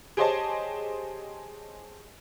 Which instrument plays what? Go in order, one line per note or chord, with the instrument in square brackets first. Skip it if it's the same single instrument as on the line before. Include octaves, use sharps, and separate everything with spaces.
[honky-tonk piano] G4 G#4 C5 C#5 D#5 A5